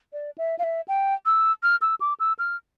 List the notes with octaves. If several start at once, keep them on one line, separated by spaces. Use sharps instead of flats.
D5
E5
F5
E5
G5
E6
F6
E6
D6
E6
F6